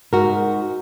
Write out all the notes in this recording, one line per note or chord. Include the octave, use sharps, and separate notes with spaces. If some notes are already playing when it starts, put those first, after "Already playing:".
G#2 F#4 A#4